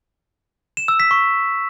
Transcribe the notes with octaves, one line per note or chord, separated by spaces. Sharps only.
E7
E6
B6
C#6